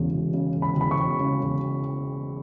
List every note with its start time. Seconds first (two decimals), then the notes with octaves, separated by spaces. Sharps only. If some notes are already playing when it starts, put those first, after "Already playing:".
Already playing: E1 E2 C#3
0.12 E1
0.34 C#3
0.56 E1
0.62 B5
0.77 E2 B5
0.91 C#6
0.99 E1
1.21 C#3
1.42 E1